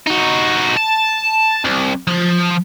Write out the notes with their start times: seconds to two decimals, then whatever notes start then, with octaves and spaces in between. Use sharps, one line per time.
0.07 D#4 F#4
0.77 A5
1.64 C2
2.07 F3